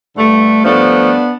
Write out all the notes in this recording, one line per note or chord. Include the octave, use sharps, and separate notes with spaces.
G2 D3 A3
G2 F3 A3 B3 D4